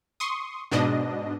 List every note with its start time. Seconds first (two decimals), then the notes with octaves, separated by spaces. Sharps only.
0.20 C6 C#6 D#6
0.71 G#2 B2 D4 D#5